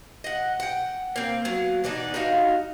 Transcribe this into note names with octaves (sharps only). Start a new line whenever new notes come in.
D#5 F#5
F#5 G5
A#3 C4
F#3 A#3 B3
E3 B3 D4 D#4
D#4 F#4 D#5 F5